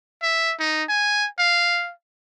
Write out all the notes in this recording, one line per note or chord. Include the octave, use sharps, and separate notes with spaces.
E5
D#4
G#5
F5